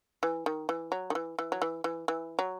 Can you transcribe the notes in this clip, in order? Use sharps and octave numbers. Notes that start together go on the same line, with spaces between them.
E3
D#3
E3
F#3
D#3
E3
E3
F#3
E3
E3
E3
F#3